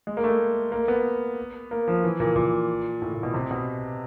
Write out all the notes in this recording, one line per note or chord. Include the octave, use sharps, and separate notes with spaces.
G#3
A#3
A3
A#3
B3
A#3
F3
E3
A#2
A#2
A2
A#2
B2
C3
B2